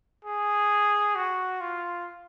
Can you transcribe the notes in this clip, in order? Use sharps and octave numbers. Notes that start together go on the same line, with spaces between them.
G#4
F#4
F4